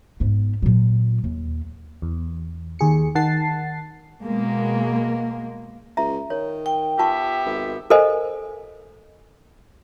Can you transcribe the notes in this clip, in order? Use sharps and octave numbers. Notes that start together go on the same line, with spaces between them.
G#2 B3
A#2 F#3
D#2
E2
D#2 G#4 C#7
D#3 F#5 A5 A6 C7
B2 G#3 A#3
C#2 E5 A#5
D#3 C#5
G5
B3 F4 G4 E5 A5 C#6
G#1
A4 A#4 C5 D#5 G#5